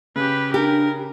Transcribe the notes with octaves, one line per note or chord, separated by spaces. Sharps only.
C#3 G4 B4
D4 G4 A#4